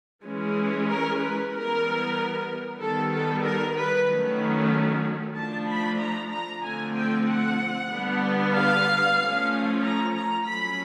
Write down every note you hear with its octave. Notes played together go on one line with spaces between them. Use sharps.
E3 G#3 C#4
A#4
B4
E3 G3 B3 A#4
D#3 G3 B3 A4
A4
A#4
B4
D#3 F#3 A3 C#4
F3 A3 D4 A5
B5
A#5
A#5
D3 F3 A3 C4 G#5
G5
F#5
D3 G3 B3 D4
F5
F3 A3 C#4
A#5
A#5
F#3 A3 C#4 B5